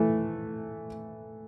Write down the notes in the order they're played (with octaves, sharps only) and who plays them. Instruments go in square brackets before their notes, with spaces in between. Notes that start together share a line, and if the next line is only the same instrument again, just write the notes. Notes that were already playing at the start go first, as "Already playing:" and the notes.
Already playing: [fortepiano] E3 A3